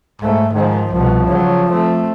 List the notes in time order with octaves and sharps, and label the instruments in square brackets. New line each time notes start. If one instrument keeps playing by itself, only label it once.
[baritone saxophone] G#2 [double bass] A3
[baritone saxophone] G#2 [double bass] D#3 F3
[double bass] C2 B2 [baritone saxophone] F3
[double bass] C#3 F#3
A3 C4